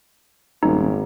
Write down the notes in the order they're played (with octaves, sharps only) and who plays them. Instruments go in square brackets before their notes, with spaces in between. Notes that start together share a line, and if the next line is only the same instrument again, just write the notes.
[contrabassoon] D#1 [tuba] G#1 [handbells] D#4